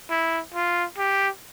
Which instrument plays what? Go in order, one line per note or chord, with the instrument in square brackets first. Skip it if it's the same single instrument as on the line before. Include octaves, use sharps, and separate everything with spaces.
[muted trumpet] E4
F4
G4